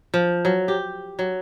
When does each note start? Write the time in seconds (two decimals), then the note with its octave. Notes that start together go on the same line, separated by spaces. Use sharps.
0.14 F3
0.45 F#3
0.68 G4
1.19 F#3